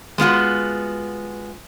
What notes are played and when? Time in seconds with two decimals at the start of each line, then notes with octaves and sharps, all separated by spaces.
0.18 G#3 B3 F4 F#4